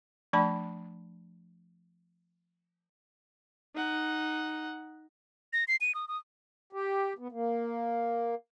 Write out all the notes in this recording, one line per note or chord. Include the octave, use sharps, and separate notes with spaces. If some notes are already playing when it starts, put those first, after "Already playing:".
F3 A3 D4 D5 A5 B5
D#4 F#5
A#6
C7
D#7
D#6
D#6
G4
B3
A#3